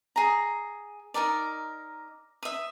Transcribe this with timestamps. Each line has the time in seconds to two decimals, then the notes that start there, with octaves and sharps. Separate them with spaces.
0.16 G#4 A#5
1.14 D#4 G#4 A#4 D5
2.43 E5 D#6